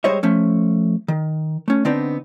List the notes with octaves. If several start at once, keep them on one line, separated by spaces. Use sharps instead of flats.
G3 G#3 C5 C#5 D#5 E5
F3 A3 C#4
D#3
A3 C#4
D3 B3 C4 D4 D#4